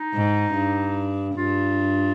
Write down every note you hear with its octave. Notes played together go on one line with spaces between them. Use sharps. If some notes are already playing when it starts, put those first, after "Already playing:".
Already playing: D#4
G#2
G2
G2 F4